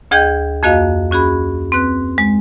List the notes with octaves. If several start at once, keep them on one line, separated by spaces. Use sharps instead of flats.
D2 G#4 D#5 G5 G6 G#6
F2 A#3 F#4 D#5 F5
C#4 F#4 G#4 B5
C4 B4 F#6
G#3